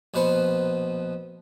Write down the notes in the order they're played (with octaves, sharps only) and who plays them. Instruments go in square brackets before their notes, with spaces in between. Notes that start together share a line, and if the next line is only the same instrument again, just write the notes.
[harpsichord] A#1 B2 B4 C5 F#5